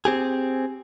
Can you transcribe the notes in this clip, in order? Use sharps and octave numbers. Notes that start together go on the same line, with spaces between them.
C4 G4 G#4